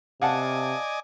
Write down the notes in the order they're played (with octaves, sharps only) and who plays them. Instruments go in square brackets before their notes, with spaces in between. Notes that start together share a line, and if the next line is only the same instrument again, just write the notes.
[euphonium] C3 [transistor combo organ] D5 D#5 G#5 [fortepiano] F5 F#5 A5